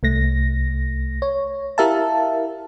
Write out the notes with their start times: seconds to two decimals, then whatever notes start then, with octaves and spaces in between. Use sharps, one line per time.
0.03 C2 A3 A#6
1.22 C#5
1.78 E4 G4 A#4 E5 F5 A5